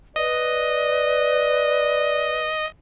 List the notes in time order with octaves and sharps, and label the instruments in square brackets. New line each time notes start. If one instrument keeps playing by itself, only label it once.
[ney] B4 [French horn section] D5 [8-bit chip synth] D#5